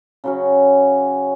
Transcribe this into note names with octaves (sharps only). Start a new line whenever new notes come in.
C#3 F#3 C#4